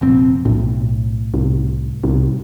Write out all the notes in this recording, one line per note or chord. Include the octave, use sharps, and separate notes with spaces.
F1 A#1 C4
B1 A2
C2
C2